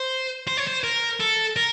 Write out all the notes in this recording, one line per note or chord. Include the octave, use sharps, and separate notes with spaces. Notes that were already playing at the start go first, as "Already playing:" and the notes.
Already playing: C5
C5
C#5
C5
A#4
A4
A#4